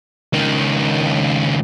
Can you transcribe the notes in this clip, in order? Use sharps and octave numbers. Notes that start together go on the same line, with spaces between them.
C#2 D#3